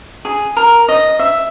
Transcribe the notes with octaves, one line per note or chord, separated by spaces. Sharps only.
G#4
A#4
D#5
E5